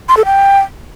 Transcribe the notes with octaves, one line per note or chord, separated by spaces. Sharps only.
C6
A4
G5